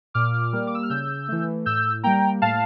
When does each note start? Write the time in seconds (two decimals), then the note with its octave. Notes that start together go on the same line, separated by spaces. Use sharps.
0.14 A#2 D6 F6
0.53 G3 A#3
0.67 D6
0.75 E6
0.83 F6
0.90 C#3 E6 G6
1.28 E3 A3
1.66 A2 E6 G6
2.03 G3 A#3 G5 A#5
2.42 A2 F5 A5